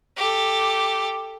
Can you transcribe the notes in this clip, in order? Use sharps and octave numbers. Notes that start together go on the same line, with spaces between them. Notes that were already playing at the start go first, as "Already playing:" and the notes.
G4 A4